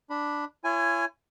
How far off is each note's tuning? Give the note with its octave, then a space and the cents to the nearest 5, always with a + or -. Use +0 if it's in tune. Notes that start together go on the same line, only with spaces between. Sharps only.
D4 +0 B5 +0
E4 +45 C#5 +0 G#5 +0